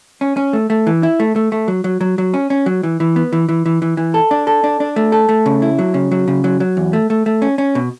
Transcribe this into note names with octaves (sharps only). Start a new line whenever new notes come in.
C#4
C#4
A3
A3
E3
E4
A3
A3
A3
F#3
F#3
F#3
F#3
C#4
C#4
F#3
E3
E3
B3
E3
E3
E3
E3
E3
A4
D4
A4
D4
D4
A3
A4
A3
C#3
E4
F#3
C#3
F#3
C#3
F#3
F#3
E2
A3
A3
A3
C#4
C#4
B2